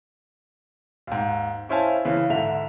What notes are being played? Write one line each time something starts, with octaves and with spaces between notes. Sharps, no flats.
D#2 G#2
C#4 E4 C5 F5 G#5 A5
C#3 E3
G#2 D3 E5 F7